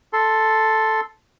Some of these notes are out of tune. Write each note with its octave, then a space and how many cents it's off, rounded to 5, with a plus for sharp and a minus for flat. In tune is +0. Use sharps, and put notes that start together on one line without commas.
A4 +0 C6 +0